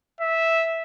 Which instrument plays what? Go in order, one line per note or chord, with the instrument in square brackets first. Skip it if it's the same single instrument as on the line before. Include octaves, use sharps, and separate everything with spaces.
[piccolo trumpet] E5